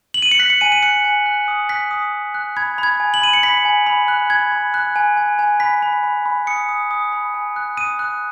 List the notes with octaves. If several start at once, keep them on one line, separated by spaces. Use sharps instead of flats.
F#7
D#7
C#7
F#6 B6
C#7
G#5 D#7
D#7
F#6 C#7
G#5
F#6
D#6
F#6 B6
D#6
D#6
F#6
B5 G#6
B5
G#6
G#5
F#7
B5 D#7
C#7
B5 B6
G#5
B5
F#6
B5 G#6
B5
F#6
G#5
G#5
G#5
B5 B6
B5
B5
B5
D#6 C#7
D#6
D#6
B5
G#5
F#6
D#6 D#7
F#6